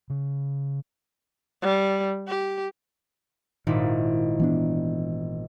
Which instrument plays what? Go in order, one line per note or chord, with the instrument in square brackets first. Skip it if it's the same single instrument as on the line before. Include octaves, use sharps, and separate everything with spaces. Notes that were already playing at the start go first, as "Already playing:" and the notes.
[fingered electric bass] C#3
[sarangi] G3
G4
[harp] G#1 A#2 E4 [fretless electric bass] D#3
[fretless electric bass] E3 B3 D4